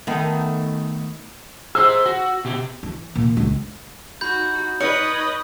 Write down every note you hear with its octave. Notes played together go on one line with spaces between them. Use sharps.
D#3 A3 B3
G#4 C5 E6
F#4
B2 G4
E3
A#2
C#2
D#4 F#4 B5 G6
B4 C#5 D#5